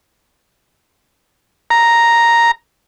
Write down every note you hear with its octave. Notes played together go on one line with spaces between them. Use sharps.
A#5